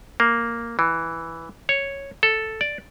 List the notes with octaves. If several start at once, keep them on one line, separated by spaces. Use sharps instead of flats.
A#3
E3
C#5
A4
D5